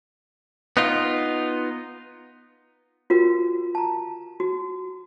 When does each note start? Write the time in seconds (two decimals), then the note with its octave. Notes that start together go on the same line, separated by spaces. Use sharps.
0.77 B3 D#4 F4
3.10 F4 F#4 A#4
3.75 A5 A#5
4.40 F#4